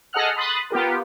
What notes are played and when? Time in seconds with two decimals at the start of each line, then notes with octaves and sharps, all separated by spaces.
0.13 G#4 A4 D#5 F#5 F6 F#6
0.36 B5 C6 D#6 F#6 A6
0.70 B3 F4 G4 A#4